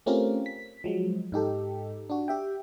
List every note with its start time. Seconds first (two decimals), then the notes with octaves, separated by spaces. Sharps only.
0.06 A3 C4 C#4 F4 G4 A#4
0.46 B6
0.84 F3 F#3 G#3
1.32 G#2 D#4 G4 A4
2.10 D4 F#4
2.28 G4 E5 G5